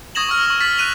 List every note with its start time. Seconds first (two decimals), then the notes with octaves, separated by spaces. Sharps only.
0.15 C#6 D#6 G#6 A#6 E7 F#7
0.29 C#6 E6 F6
0.46 C#6 F6
0.61 F6 A6 B6
0.78 F#6 D#7 F7